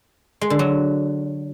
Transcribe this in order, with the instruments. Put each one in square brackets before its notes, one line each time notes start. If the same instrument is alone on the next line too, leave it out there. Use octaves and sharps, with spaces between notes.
[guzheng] G#3
D3
F#3